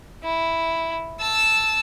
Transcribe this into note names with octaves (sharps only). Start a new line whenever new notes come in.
E4
A5 E6